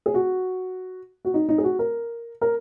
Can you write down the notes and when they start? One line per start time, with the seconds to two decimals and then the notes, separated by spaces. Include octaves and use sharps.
0.06 G#4
0.14 F#4
1.25 F#4
1.34 D#4
1.49 D#4
1.58 G#4
1.64 F#4
1.79 A#4
2.41 A#4